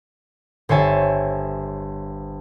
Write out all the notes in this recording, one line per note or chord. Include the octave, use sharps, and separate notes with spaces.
G1 C5 C#5 E5 G#5 A6